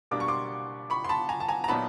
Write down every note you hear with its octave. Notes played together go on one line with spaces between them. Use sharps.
B2 G3 A#3 D4 D6
C#6
C6 D6
B5 C#6
C6
A5 B5
G#5 A#5
A5
G#5 A#5
A#5
A#2 F#3 B3 D#4 A5 B5